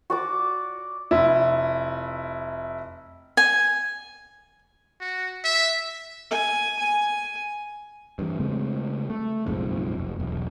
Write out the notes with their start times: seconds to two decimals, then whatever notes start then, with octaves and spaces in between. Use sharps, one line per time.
0.10 F#4 D5 D6
1.11 F1 E4
3.37 G#5
5.01 F#4
5.44 E5
6.31 G#5
6.79 G#5
8.19 G2 E3
8.40 C#3 G#3 A3 C4
9.10 A3
9.46 F#1 B1 F2 G#2
9.98 F1
10.19 E1 B1